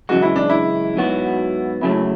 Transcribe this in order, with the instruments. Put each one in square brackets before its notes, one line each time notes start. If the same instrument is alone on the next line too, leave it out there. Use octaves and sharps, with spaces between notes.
[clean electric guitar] F#2 C#3 E3 G#3 [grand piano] F#4
[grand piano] E4
D4
E4
[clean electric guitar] G#2 F#3 B3 F#4
[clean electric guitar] F#2 C#3 F#3 A3 [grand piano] E4